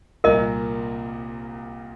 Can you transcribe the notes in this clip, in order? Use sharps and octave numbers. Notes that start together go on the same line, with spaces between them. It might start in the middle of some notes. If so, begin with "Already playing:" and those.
C2 A#2 A#3 A#4 D#5